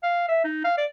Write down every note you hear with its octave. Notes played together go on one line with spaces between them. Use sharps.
F5
E5
D#4
F5
D5